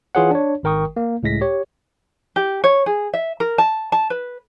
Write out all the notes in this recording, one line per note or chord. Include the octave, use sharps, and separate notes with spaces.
E3 F4 G#4 C#5 F#5
D4 C#5
G#1 D#3 A#4 G5 C#6 D#6
A#3
C#2 A2 G#3 A#6 B6
G4 C#5
G4
C#5
G#4
E5
A#4
A5
A5
B4